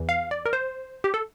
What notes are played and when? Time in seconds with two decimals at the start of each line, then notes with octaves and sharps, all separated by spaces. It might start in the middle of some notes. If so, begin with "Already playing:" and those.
Already playing: E2 E3
0.09 F5
0.31 D5
0.46 A#4
0.53 C5
1.04 G4
1.14 A4